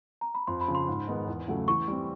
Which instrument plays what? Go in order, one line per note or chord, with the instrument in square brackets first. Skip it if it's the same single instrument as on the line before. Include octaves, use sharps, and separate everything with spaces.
[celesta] A#5
B5
[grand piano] F2 [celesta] C6
[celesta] B5
[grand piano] C#3 F3
[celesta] C6
[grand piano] G#2
D#3 G#3 B3 D#4
E2
C#3 F#3 A3 C#4
[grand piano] E3 [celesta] C#6
[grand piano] G3 C4